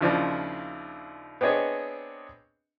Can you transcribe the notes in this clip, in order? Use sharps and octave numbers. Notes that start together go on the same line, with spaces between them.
D#2 C#3 F3 D4 E4 F4
B3 C4 D4 G#4 C#5 D#5